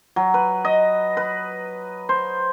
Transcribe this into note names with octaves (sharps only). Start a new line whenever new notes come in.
F#3
B4
D#5
B4
C5